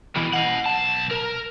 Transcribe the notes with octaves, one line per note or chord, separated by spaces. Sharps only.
B2 E3
D#5 F#5
B1 A5
A#4